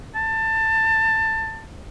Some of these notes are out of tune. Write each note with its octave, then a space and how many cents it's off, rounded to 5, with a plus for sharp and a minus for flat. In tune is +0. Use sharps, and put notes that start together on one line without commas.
A5 +20